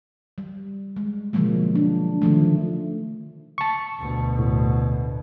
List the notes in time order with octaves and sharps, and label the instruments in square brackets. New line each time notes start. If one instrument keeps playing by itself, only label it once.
[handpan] G3
G#3
B2 D3 F3 F#3 G#3 A#3
D4
D3 D#3 F3 A3
[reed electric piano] A5 C#6
[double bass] D2 B2
[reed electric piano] A2